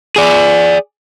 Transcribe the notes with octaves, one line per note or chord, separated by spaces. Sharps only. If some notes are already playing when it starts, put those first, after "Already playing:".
G#4 D5